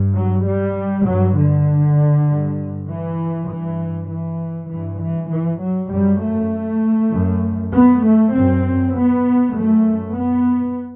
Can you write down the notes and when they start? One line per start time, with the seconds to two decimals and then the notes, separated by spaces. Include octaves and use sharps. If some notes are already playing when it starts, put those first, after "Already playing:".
Already playing: G2
0.15 F#3
0.46 G3
1.08 G2 F#3
1.38 D3
2.29 G2
2.90 E3
3.49 G2 E3
4.11 E3
4.70 G2 E3
5.01 E3
5.32 E3
5.62 F#3
5.92 F#2 G3
6.23 A3
7.13 F#2
7.74 B3
8.05 A3
8.34 F#2 C4
8.96 B3
9.56 F#2 A3
10.17 B3